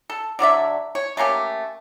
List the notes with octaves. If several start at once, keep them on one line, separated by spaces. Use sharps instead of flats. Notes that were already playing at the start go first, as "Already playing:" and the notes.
A4
D3 F#3 D5 E5
C#5
A3 A#3 C#4 G4